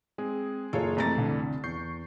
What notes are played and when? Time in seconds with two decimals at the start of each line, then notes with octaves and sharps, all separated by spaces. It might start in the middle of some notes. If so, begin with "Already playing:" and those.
0.18 G#3 C4 G#4
0.73 F#1 F4 G#4 A4 C#5
0.97 F2 C3 E3 A3 A#5 A6
1.16 C2 D3
1.64 E2 C#6 G6 C7